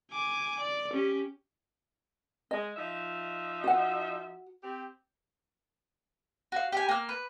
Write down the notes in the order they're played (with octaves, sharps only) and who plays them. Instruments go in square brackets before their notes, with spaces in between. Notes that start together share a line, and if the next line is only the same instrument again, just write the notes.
[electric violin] G#5 D6
D5
C#4 G4
[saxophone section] G#3 [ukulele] D#5
[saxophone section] F3 D#4 E5
[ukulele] F#4 F#5
[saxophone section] C4 G4
[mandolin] F#4 F5
G4 G#5
A#3 F6
B4